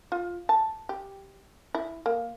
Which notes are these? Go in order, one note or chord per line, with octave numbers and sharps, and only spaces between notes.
F4
A5
G4
E4
A#3